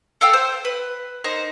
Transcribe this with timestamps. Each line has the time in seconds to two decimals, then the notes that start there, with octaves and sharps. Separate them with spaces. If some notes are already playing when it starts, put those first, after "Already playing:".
0.21 A4 F5 G5 E6
0.33 C5
0.65 B4
1.24 D#4 A#4 C5